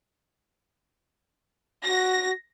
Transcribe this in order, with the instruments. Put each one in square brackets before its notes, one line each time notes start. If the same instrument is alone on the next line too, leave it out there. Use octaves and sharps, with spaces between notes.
[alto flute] F#4 [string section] A#6